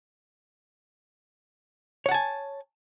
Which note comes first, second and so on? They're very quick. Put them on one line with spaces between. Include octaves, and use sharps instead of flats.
C#5 F#5 A5 G#5